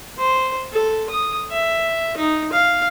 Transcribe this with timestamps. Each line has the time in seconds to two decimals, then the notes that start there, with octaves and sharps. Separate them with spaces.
0.18 C5
0.73 A4
1.09 D#6
1.51 E5
2.17 D#4
2.52 F5